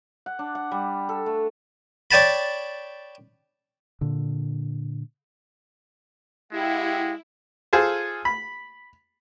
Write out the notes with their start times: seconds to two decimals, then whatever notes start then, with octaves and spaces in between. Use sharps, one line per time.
0.26 F#5
0.39 D4
0.55 F#5
0.71 G3
1.09 A4
1.26 A3
2.11 C#5 D5 G5 A5 B5
4.01 A#2 D3
6.51 G#3 E4 G4 F5 F#5
7.73 F4 G#4 A4 C5
8.25 B5